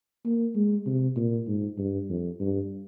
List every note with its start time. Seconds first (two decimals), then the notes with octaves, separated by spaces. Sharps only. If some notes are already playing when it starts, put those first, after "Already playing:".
0.25 A#3
0.55 G#3
0.86 C3
1.16 A#2
1.47 G#2
1.78 G2
2.09 F2
2.40 G2